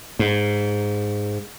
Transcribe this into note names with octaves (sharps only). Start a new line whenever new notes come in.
G#2